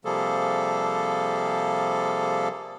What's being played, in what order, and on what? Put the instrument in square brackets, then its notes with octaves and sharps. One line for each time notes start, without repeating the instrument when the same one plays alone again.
[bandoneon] C3 F3 G3 A#3 G#4 A4